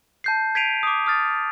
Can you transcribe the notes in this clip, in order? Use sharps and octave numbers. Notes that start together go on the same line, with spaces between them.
A5 G6 C7
G#6 B6 C7 D7 D#7 F7
D6 D#6
D#6 F6 A6